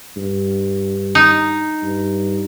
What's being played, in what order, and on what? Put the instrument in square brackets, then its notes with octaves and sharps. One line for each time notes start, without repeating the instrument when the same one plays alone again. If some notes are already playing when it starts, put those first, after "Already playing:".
[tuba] G2
[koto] D#4
[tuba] G2